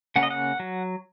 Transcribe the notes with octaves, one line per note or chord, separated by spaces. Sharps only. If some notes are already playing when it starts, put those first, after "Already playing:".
C#3 A#3 C#4 F#5
D#5
F#5
F#3